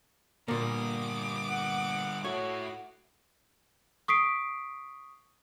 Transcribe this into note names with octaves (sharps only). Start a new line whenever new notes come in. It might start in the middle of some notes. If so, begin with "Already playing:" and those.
A#2 D3 G3 A#3 D6 D#6
F#5
A3 E4 F#4 C#5
C#6 D#6 B6 C7 D7